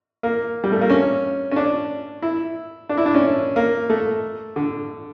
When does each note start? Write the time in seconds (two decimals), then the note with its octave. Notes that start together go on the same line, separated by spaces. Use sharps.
0.23 A#3
0.64 G3
0.72 A3
0.81 A#3
0.90 C#4
1.51 C#4
1.56 D4
2.22 E4
2.89 D4
2.97 E4
3.06 D4
3.14 C#4
3.56 A#3
3.89 A3
4.56 D3